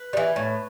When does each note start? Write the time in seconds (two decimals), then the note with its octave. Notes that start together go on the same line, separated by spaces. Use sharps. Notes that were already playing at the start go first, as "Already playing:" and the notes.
Already playing: B4
0.13 G3
0.17 E3
0.36 A2